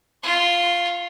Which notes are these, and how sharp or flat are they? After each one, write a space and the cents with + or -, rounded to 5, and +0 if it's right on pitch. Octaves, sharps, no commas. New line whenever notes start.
F4 +0 C#6 -45